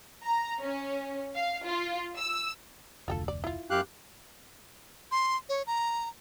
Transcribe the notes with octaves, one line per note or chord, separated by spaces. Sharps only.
A#5
C#4
F5
F4
E6
F1 D2 F4 G4 A4
D5
E4 F4
F#2 G4 F5 F#6
C6
C#5
A#5